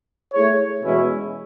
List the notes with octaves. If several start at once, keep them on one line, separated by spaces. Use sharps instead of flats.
A3 E4 G#4 C#5
E2 B2 G#3 C#4 E4